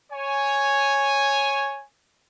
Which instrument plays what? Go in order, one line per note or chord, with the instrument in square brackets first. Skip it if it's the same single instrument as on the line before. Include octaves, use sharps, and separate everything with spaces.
[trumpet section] C#5 G#5